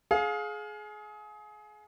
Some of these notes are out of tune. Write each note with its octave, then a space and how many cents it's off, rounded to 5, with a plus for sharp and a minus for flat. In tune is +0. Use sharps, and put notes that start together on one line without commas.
G#4 +25 F5 +25